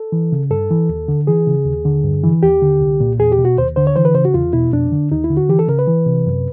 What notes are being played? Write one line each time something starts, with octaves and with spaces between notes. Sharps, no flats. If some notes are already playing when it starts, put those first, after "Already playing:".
Already playing: A4
E3
C#3
G2 A4
E3
D#2
D3
E3 G#4
C#3
D#2
D3
G2
E3
D#2 G4
D3
C2
A#2
E2 G#4
G4
B2
F#4
D#2 C5
D3 C5
C#5
E3 C5
B4
C#3 C5
F#4
E2 F4
B2 E4
F2 D4
D3
D#2 D#4
E4
D3
F#4
E3 G4
A4
C#3 A#4
B4
E3
C3
F#2